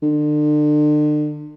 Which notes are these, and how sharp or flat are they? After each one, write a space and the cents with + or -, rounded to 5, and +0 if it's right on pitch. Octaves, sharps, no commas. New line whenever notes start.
D3 +35